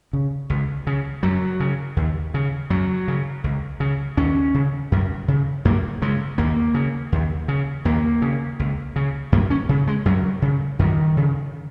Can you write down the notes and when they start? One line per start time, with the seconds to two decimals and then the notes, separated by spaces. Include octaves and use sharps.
0.13 C#3
0.50 C#2
0.87 C#3
1.23 F#2 F#3
1.60 C#3
1.97 D#2
2.34 C#3
2.70 F#2 F#3
3.08 C#3
3.44 C#2
3.80 C#3
4.17 D#2 C#4
4.54 C#3
4.92 F#2
5.28 C#3
5.65 F#2 A#3
6.02 C#3 G#3
6.38 D#2 A#3
6.74 C#3
7.12 D#2
7.48 C#3
7.85 D#2 A#3
8.22 C#3
8.59 C#2
8.96 C#3
9.32 F#2 A#3
9.50 C#4
9.69 C#3
9.87 G#3
10.05 F#2 F#3
10.42 C#3
10.79 F#2 D#3
11.17 C#3